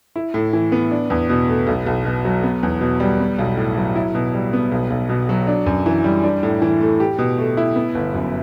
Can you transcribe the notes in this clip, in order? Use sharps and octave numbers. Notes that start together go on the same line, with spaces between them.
E4
A2
E3
B3
D4
E2
B2
A3
B1
B1
B2
F#3
B3
E2
B2
G3
B3
B1
A2
F#3
E4
B2
G3
B3
B1
B1
B2
F#3
D4
F#2
E3
G3
D4
A2
E3
A3
G4
B2
A3
E4
B3
G1
F#2